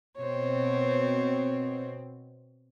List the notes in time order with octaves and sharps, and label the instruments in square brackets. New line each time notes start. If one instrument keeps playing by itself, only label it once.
[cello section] B2 C4 [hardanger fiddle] C5 C#5